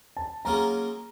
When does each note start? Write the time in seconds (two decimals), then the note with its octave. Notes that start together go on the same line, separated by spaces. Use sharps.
0.17 A5
0.45 F#3 A#3 C#4 F4 G#4 A#5